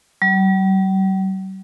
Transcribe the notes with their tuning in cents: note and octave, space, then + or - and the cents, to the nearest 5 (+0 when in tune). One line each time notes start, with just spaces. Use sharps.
G3 -45